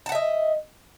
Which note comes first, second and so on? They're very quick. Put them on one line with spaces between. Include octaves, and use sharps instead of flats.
A5 F#5 E5 D#5